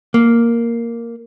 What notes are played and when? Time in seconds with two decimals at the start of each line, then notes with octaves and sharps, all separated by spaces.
0.14 A#3